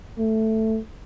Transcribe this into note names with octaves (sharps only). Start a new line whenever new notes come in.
A3